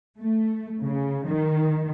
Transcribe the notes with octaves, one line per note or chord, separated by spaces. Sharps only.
A3
C#3
D#3